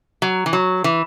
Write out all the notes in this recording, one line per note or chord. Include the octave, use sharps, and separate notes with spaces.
F#3
E3
F#3
E3